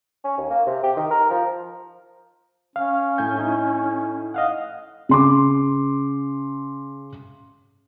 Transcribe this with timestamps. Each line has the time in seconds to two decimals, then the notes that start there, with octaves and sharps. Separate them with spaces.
0.24 C#4
0.38 D#2
0.50 A#3
0.66 C3
0.83 G4
0.96 D#3
1.11 A#4
1.30 F3
2.76 C#4 F5
3.18 A2 G#5 G6
3.36 D#4 E4
4.34 D#5 F5 F#5
5.09 C#3 C6 D6